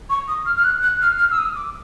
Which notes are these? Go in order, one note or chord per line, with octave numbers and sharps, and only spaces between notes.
C#6
D#6
F6
F6
F#6
F#6
F6
F6
E6
D#6
D6